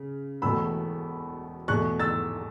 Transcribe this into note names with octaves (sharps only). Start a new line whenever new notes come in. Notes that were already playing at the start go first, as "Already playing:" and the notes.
Already playing: C#3
E1 E2 B2 A3 B5 E6
E2 B2 A3 C#6 F#6
E6 A6